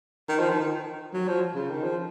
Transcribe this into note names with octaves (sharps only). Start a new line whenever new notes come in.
D#3
F3
D#3
D#3
F#3
F3
C#3
D#3
F3